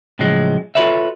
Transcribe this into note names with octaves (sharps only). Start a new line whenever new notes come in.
A2 C#3 F3 F#3 G#3
F4 F#4 A4 B4 C#5 E5